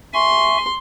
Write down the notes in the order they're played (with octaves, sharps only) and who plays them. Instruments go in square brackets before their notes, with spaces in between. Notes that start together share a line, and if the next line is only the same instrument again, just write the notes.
[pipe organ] E5 G#5 C#6 [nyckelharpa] C6